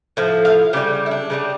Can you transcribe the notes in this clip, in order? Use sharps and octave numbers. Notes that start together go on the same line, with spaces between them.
A2 F3
F5
C#3 E3 G3 G4
E4
D4
C#3 E3 G3